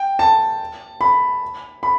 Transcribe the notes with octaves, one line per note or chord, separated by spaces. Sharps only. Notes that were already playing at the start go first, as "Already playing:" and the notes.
Already playing: G5
A5
B5
B5